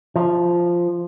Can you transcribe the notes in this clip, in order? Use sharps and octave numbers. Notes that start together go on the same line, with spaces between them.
F3